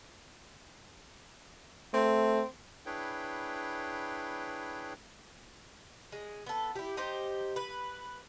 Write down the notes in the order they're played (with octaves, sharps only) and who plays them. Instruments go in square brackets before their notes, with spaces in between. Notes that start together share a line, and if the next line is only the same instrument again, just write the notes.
[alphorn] A3 [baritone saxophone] C4
[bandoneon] D4 E4 G#4 B4 C#5 G5
[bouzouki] G#3
B3 A4
E4 G4
D#4 G4 C5
B4